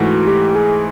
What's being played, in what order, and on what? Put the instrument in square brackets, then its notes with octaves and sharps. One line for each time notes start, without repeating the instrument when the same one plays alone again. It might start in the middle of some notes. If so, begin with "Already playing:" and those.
Already playing: [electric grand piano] G#2 E3 A3 [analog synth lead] F#4
[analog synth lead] G4
G#4